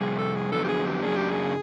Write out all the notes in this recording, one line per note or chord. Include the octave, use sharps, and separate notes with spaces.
F2 C3 G3 G#4
A4
G#4
F2 D3 F#3 B3 A4
G4
G#4
G4
F#2 C#3 F#3 A#3 D4 G#4
G4
G#4